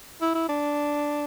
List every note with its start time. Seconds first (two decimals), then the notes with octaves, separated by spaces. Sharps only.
0.21 E4
0.35 E4
0.49 D4